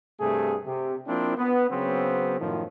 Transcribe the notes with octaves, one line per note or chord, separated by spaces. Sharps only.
G2 C3 A3 G#4
C3
F3 A#3 C4 D4 E4
B3
C#3 F#3 B3 C4
F#2 A2 D#3 F3